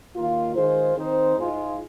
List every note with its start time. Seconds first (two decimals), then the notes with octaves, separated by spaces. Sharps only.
0.15 D#2 D#3 A#3 F4
0.55 D#3 G#3 F4 G#4 C5
0.96 D#3 C4 D#4 C5
1.37 G#2 G#3 F4